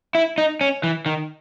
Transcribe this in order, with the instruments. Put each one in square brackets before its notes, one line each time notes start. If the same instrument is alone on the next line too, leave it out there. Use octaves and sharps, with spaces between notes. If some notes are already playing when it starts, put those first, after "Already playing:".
[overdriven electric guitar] E4
D#4
C#4
E3
D#3